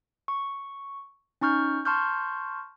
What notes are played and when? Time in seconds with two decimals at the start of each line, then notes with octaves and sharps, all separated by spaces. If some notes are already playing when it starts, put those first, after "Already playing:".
0.28 C#6
1.41 C#4 D#4 C#6 F6 G6
1.85 A5 C6 C#6 F6 G6